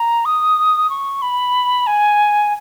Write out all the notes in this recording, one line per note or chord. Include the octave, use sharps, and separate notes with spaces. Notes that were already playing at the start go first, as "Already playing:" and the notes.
Already playing: A#5
D#6
C#6
B5
G#5